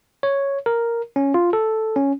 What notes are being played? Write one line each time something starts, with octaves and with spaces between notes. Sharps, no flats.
C#5
A#4
C#4
F4
A4
C#4